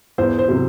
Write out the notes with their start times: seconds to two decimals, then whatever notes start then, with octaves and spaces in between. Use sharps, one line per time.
0.18 E2 C5
0.39 C5
0.49 C3 F#3